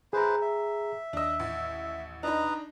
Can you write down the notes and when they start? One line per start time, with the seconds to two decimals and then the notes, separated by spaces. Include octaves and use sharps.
0.13 E4 G#4 B4 C5 A#5
0.41 E5
1.13 D#2 D4 D#5 E6
1.40 A1
2.23 D4 D#4 B4 D#5 A#5